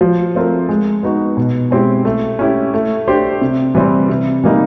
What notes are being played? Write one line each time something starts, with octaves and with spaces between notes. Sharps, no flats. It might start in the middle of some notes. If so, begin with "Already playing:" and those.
F3
A3 C4 F4 A#4
G#3
B3 D#4 F#4
B2
G#3 C4 E4 G4
A3
C#4 E4 G4
A3
D4 G4 C5
C3
E3 G3 C4
C3
E3 G3 A#3 D#4